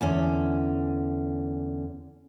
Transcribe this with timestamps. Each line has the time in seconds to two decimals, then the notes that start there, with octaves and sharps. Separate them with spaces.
0.01 E2 D3 C#4